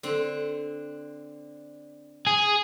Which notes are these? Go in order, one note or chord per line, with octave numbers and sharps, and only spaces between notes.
D3 C4
G#4